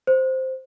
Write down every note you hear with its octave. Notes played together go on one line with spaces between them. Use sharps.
C5